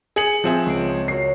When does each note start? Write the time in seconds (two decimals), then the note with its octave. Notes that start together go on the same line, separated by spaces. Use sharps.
0.16 G#4 C#7 F#7
0.44 F3 C4 G#4 E5 F#6
0.66 C#2 C7 D7
1.08 F#4 A#4 C#5 C7